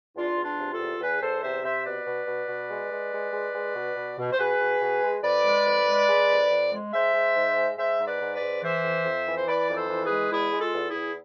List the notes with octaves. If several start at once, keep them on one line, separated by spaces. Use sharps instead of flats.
E2 D4 F4
E2
D4 F4
C3
F4 A4
E2
E2 G#4 B4
E2 A4 C5
C3 C5 E5
C3 C5 E5
B2 B4 D5
B2
B2
B2
G#3
G#3
G#3
G#3
G#3
B2
B2
B2
C5
B2 G#4 B4
B2
B2
G#3
F2 B4 D5
G#3
F2
G#3
G#3
F2
F2
G#3
G#3 C5 E5
G#3
G#2
G#3
G#3 C5 E5
G#2
B4 D5
G#2
B4 D5
G#2
E3 C5 E5
F2
F2
E3
C5
E3 B4 D5
F2
A4 C5
E3
G#4 B4
G#3
E2 E4 G#4
G#3
F4 A4
E2
E4 G#4
E2